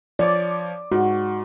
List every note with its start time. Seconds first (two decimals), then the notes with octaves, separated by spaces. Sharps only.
0.19 F3 C#5 D5 D6
0.92 G#2 F#4